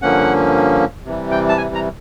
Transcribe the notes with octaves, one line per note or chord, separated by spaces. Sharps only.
G2 D3 F3 A#3 C#4 F#5
C3 E3 G3
G5
A5
G#5
A#5